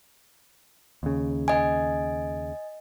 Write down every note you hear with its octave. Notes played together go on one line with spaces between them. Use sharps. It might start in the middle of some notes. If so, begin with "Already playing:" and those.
D#2 C#3
D#5 G#5